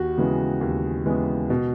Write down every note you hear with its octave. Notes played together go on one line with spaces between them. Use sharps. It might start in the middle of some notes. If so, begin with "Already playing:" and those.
Already playing: D#2 F#4
C#3 E3 G#3 B3
D#2
C#3 E3 G#3 B3
B2